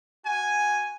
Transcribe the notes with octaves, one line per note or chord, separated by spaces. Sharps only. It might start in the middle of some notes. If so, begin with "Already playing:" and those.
F#4 G#5